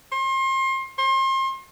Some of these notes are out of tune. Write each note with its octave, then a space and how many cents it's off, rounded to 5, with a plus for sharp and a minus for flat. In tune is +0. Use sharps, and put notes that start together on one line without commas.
C6 +35
C6 +35